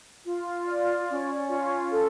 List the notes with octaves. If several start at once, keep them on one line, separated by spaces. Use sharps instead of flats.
F4
D5
C#4
F4
A4